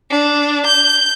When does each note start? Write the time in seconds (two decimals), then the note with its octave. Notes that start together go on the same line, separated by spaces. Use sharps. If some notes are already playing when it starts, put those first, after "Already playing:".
0.10 D4
0.66 G6